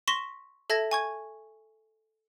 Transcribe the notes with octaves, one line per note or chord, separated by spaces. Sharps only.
C6 C#6 A#6 B6 E7 G7
A4 E5 A5 G#6 A#6
G#5 C#6 G#6